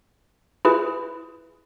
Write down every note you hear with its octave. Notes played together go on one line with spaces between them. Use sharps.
E4 F4 G#4 B4